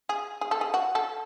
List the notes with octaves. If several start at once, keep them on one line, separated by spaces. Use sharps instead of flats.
G#4
G#4
A4
G#4
F#4
A4